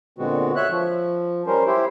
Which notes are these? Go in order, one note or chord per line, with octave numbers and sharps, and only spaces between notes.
A#2 D3 G#3 B3 C4 F#4
C#5 E5 F#6
F3
G3 C#4 A#4 C5
E4 G4 C5